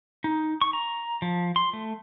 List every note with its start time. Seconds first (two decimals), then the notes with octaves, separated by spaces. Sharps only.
0.24 D#4
0.61 C#6
0.73 A#5
1.22 F3
1.56 C6
1.73 A3